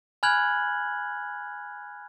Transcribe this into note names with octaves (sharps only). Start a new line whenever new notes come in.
G#5 B5 F6 F#6 G#6 F#7